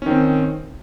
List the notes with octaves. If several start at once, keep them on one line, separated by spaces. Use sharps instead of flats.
D#3 C4 C#4